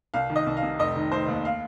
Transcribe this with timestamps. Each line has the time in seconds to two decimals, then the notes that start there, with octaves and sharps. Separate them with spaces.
0.14 C2 F5
0.30 D#3
0.36 D#5
0.46 C2
0.57 F5
0.63 C3
0.79 F1 D#5
0.96 D#3
1.11 F1 C5
1.28 D#2
1.45 F5